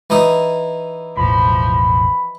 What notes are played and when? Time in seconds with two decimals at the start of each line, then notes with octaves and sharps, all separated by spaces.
0.10 E3 D#4 D#6
1.17 E1 A1 A2 F3 B5